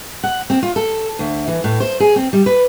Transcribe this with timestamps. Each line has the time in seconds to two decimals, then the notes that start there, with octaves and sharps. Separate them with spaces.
0.23 F#5
0.50 C4
0.63 F4
0.76 A4
1.19 D2
1.47 E3
1.64 A2
1.80 C5
2.00 G#4
2.16 C4
2.33 G3
2.46 B4